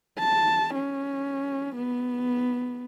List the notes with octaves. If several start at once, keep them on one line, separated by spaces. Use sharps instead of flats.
A5
C#4
B3